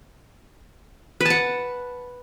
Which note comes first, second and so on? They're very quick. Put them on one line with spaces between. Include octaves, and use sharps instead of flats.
B4 A5 F#5